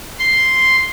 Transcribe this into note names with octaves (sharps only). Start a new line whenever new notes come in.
C6